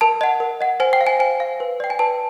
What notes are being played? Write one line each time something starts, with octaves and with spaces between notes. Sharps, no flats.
A#4 A5
D#5 F#5
A#4
D#5 F#5
C5 G#5
G5
F5
G#5
C5 G#5
F5
B4
D5 G5
G#5
B4 A5